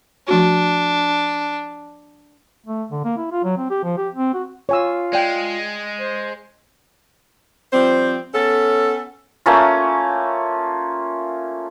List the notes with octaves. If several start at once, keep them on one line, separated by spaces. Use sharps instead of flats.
F3 A3 D4 F#4
A3
D3
A#3
E4
F4
F#3
C4
G4
F3
G4
C4
F#4
F4 C#5 G#5 E6
G#3 D5 G5
C5
F3 G3 C4 C5
B3 C#4 A4
A3 A#3 C#4 F4